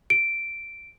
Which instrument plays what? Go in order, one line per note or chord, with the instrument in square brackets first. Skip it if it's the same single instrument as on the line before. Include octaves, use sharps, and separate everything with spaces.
[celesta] D7